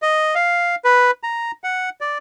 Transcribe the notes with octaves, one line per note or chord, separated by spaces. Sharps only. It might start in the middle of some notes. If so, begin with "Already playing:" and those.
D#5
F5
B4
A#5
F#5
D5